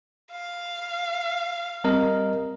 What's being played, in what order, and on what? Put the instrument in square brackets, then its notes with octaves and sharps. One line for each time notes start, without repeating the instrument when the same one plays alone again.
[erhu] F5
[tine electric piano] G3 A#4 D#5 [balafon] C4